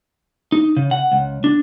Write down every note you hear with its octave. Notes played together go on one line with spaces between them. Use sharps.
D#4
C#3
F#5
C#2
D4